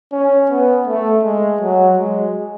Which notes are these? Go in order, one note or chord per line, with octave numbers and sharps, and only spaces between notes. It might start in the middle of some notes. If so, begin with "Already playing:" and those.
C#4
B3
A3
G#3
F#3
G#3